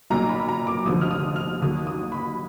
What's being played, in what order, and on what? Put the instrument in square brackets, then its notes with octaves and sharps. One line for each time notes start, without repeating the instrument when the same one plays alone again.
[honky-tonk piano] B1 A#2 F#3 A#5
B5
A#5
D6
F1 D#2 D3 F3 D#6
F6
D#6
F6
D#2 D#3 F#3 D#6
D#6
B5